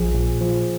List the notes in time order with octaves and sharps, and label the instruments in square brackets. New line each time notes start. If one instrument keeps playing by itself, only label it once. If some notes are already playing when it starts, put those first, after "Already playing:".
Already playing: [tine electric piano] A#1 F3 G#4
A#2
F3